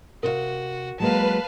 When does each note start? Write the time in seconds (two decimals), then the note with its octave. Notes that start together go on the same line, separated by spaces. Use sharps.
0.23 C3 F#4 A#4 C#5 F5
1.00 F#3 G#3 A#3 B4 F5 A5